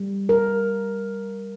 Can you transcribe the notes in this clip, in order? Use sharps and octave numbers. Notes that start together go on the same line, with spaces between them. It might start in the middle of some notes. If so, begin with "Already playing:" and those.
Already playing: G3
A#4